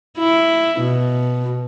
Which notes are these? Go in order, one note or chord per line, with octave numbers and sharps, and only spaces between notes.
E4
B2